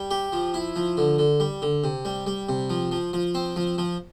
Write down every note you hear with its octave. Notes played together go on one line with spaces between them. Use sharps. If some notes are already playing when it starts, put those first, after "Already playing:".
Already playing: G3
G4
F3
E4
F3
D3
D3
G3
D3
C3
G3
G3
C3
F3
F3
F3
C4
F3
F3